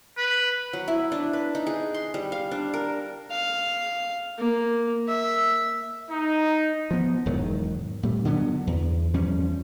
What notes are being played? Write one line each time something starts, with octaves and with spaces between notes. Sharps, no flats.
B4
F#3
E4
D4
B4
D#4
G#4
C6
G3
F5
D4
A#4
F5
A#3
E5
D#4
F3 B3
E1 G#2 D#3 F#3
A#2 G3 A3
D3 D#3 F#3 B3
E2
E2 F3 G3 C#4